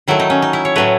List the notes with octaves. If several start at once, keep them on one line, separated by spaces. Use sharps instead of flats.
D#3 F#3 A3 E4
D#4
C#4
D#4
E4
C#5
A2 F#3 A3 B4